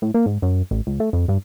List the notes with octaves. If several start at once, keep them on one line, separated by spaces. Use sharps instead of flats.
A2
A#3
G#2
F#2
A1
C#2
A3
F2
G2